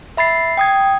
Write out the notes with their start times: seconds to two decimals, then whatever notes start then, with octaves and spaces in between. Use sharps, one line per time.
0.17 E5 B5 A6 C7
0.57 G5 D#6 G#6